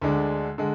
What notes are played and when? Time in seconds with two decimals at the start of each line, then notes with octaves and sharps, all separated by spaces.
0.02 D2 D3 G#3 D4
0.58 D3 G#3